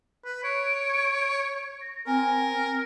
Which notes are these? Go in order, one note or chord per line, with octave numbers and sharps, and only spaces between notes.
B4
C#5 D7
A#6
C4 A#4 G#5